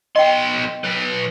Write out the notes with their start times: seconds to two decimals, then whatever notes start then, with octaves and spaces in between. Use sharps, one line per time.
0.16 B1 D#5 G5 C6
0.84 F#3 B4